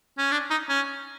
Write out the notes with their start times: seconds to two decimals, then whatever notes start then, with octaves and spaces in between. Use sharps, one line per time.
0.18 C#4
0.32 D4
0.50 D#4
0.69 C#4